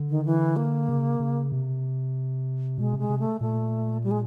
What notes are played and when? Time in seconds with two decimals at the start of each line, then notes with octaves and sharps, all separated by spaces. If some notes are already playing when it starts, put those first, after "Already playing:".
Already playing: D3
0.09 D#3
0.25 E3
0.56 A#3
0.89 C#3
1.20 C#3
1.52 C3
2.78 B2 G#3
2.94 C3 G#3
3.09 C3
3.19 A3
3.41 A#2 A3
4.04 G3
4.11 G#3